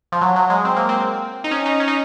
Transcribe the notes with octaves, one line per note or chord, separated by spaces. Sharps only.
F3
F#3
F#3
G#3
C4
A#3
C4
D#4
C#4
D#4
C#4
D#4